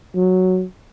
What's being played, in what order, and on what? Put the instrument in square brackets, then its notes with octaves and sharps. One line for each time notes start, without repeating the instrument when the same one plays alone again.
[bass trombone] F#3